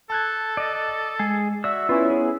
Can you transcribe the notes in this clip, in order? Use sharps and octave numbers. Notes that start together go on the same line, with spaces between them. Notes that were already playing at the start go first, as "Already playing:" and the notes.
A4 A5 F#6 G#6
D5 D#5
G#3 G#4
F#4 D5 E5 E6
B3 C#4 E4 F4
G#4